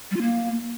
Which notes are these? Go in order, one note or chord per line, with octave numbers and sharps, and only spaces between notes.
G3
F4
A#3